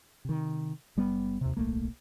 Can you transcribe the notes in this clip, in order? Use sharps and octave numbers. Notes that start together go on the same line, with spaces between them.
C3 D#3
F#1 G3 B3
D#2 C3
D1 B1 A3 A#3